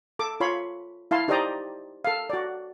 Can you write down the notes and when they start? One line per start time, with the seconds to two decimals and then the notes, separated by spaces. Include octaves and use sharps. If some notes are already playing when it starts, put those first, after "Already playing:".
0.19 A4 D6
0.40 F4 C#5 B5 C6
1.11 E4 F5 A5 C6
1.28 D#4 G4 C5 D5 D#5 A#5
2.05 A4 F5
2.30 F#4 D5